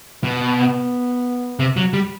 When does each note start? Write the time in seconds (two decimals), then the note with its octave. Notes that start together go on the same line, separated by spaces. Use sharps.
0.24 B2 B3
1.59 C3
1.77 F#3
1.93 G3